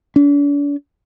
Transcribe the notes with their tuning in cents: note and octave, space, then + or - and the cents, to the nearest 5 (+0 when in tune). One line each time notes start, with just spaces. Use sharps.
D4 -40